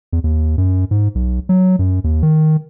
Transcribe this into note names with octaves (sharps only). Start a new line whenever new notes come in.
E2
D#2
F#2
G#2
B1
F#3
F#2
D#2
D#3